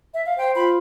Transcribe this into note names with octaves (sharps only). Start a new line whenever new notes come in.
E5
F5
C5 G5
F4 B5